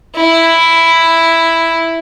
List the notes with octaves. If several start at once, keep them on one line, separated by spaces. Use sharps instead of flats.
E4